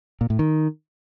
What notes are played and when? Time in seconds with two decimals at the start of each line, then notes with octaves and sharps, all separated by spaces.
0.21 A#2
0.30 A2
0.39 D#3